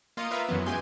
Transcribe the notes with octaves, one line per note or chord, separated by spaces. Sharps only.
A#3 F4 D#5 D#6 C#7
F4 A#4 B4 E5 F5
F#2 E3 F#3 B3
G#3 G4 G#5 C6 G6